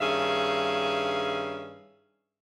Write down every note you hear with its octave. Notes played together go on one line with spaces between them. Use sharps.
G2 D#3 C#4 G#4 E5 F5